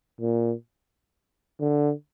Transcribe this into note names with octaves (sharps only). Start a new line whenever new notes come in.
A#2
D3